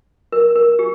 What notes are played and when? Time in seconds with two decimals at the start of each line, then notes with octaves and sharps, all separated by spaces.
0.32 A#4
0.56 A#4
0.79 G4